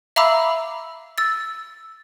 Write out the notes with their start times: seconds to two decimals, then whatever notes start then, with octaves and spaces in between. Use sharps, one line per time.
0.16 E5 F5 A#5 B5 D6 E6
1.18 E6 A6